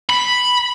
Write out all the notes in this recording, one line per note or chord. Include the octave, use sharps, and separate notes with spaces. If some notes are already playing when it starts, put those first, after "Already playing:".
B5